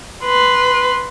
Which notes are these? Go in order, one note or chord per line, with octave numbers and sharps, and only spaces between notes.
B4 C6